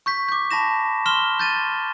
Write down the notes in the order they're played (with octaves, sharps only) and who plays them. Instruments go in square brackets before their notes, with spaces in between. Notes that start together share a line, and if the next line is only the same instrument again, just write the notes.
[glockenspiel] C#6 G6 B6
D6 G6
A5 B5 A#6 E7
C6 F6 E7 G7
G6 A6 D#7